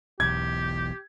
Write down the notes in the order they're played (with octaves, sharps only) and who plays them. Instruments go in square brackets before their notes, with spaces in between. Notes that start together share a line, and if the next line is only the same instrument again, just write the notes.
[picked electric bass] E1 B1 E2 [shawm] G4 [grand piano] G#6